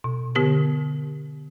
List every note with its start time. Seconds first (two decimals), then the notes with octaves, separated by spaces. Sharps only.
0.04 B2
0.35 D3 B3 G4 A#4